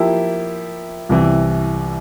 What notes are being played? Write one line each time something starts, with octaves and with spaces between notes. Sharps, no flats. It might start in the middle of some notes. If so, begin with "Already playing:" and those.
Already playing: F3 A#3 E4 G4
C2 C3 E3